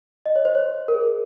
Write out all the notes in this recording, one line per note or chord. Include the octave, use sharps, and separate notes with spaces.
D#5
C#5
C5
C#5
A#4
G#4